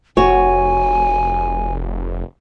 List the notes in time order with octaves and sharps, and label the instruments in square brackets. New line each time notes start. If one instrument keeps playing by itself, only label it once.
[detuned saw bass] F1 [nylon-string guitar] F#4 C#5 [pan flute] G#5